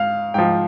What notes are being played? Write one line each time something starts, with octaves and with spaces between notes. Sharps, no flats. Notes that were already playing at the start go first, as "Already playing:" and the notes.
Already playing: G#2 F5
G#2 F3 G5